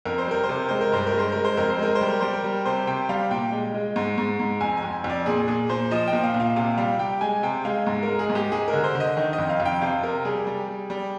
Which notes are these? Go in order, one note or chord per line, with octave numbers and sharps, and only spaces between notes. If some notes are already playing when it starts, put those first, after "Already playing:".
F2 A#4
C5
G3 A#4
C5
C3
A#4
G#3 C5
A#4
G2 C5
A#4
G#3
C5
G#3 A#4
C5
F2 A#4
C5
G#3 A#4
C5
G3
A#4
G3 C5
A#4
G3
C3 C5
C3 G5
G3 F5
A#2 G5
G#3
G#3
G#2
G#2
G#2
F2 G#5
G#5
F2
F2
D5
A#2 G#4
A#2 G#4
A#2 C5
F3 D#5
G5
A#2
F5
A#2
F5
C3 F5
G3 F5
G3 G5
G#3 G#5
C3 G5
G#3 F5
G#2
A#4
G#3
G#4
G#2
G4
G#3 G#4
A#4
D3
C5
D3
D#5
D#3
D#5
F2
F5
F2
G5
C3 F5
C3 A#4
G3 G#4
G3
G3
G3